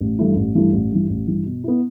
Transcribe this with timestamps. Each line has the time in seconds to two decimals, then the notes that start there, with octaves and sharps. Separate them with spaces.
0.01 A1
0.19 G2 E3 A3 E4
0.36 A1
0.55 G2 E3 A3 E4
0.73 A1
0.92 G2 E3
1.10 A1
1.27 G2 E3
1.46 B2
1.64 B3 E4